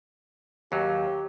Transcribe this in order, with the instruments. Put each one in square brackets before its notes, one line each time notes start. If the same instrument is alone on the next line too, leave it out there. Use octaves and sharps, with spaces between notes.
[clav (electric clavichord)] D#2 F#3 [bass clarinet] G4